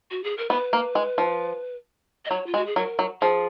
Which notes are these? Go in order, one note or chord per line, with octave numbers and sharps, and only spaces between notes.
F#4
G#4
A#4
B3 B4
A#3
G#3
F3
D#5
F#3 C#5
F4
G#3 F#4
G#4
F#3 A#4
F#3
F3 G#4